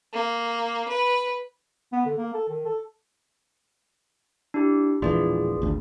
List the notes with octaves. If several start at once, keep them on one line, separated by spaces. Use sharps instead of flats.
A#3
B4
B3
D3
A#3
A4
D#3
A4
D4 E4 G4
E1 A#1 E3 F4 G#4 D5
G#1 D2